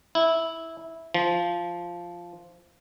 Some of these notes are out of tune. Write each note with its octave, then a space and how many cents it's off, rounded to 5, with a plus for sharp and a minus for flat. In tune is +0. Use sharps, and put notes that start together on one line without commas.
E4 -10
F3 -5